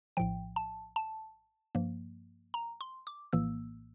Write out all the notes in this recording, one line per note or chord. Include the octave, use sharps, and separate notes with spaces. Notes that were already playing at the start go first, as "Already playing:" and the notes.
A#1 A2 F3 G5
A5
A5
G2 F3 A#3
A#5
C6
D6
A#1 A2 E3 A#3 E6